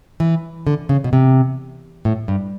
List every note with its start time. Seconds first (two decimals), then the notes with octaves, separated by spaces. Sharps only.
0.20 E3
0.67 D3
0.89 C#3
1.04 B2
1.13 C3
2.05 A2
2.28 G2